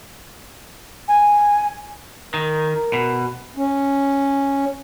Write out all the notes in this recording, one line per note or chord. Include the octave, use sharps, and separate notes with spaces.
G#5
D#3 A#4
B2
C#4